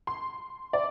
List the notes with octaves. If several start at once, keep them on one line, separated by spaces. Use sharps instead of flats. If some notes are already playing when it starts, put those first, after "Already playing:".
C6
D5